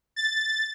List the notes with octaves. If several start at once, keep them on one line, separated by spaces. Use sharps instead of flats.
A6